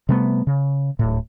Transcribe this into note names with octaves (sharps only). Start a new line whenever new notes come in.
C3 G3 A3 B3
C#3
D1 A2